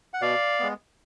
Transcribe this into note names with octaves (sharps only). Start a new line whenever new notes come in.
F#5
B2 D5 F5
G#3 B3